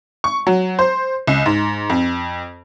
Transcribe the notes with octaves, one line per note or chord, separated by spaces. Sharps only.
C#6
F#3
C5
C#2
G#2
F2